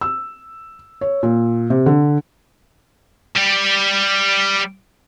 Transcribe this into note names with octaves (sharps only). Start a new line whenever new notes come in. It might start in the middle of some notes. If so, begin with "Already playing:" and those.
E6
C#5
A#2
C3
D3
G3 G4